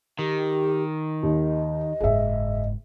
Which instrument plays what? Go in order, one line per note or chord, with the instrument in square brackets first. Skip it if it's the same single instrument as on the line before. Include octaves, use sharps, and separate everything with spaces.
[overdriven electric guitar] D#3 [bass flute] G4
[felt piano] D#2 [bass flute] D#5
[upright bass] F#1 G#2 [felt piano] G#4 E5